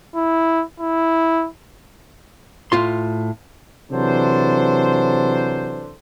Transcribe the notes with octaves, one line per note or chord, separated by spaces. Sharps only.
E4
E4
A2 F4 C6
C3 E3 F#3 D4 A4 C5